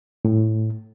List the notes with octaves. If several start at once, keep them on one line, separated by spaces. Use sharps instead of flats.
A2